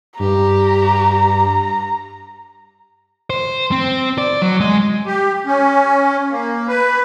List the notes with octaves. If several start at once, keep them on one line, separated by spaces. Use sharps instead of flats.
G2 G4 A#5
C5
C4
D5
F#3
G#3
G4
C#4
A#3
B4